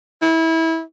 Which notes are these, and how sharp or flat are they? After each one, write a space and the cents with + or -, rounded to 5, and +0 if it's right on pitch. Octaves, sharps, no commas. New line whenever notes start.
E4 -20